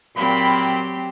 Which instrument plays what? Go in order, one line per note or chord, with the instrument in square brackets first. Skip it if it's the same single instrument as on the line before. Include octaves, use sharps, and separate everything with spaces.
[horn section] A#2 B5 [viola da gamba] F#3 C4 G4